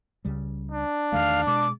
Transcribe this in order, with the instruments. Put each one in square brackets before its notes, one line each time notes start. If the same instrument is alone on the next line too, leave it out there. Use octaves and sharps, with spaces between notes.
[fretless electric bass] C#2 C#3 G3
[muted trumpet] D4
[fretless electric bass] E2 D#3 A3 [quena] F5
[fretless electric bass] B2 G#3 [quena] D6